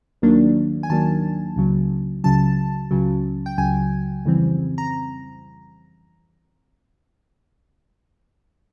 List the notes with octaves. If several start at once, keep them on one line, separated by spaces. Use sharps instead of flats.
D#2 D#3 F#3 A#3 D4
G#5
D#2 D#3 F#3 A#3 D4 A5
C#2 C#3 F#3
C#2 C#3 F#3 A5
C#2 C#3 F#3
G5
C#2 C#3 F#3 G#5
F2 C#3 E3 G3 C4
A#5